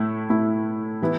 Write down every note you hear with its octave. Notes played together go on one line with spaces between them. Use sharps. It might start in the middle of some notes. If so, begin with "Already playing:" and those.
Already playing: A2 A3 E4
A2 A3 E4
E3 B3 E4